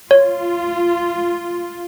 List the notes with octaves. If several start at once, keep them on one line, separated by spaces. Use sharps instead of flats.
F4 C#5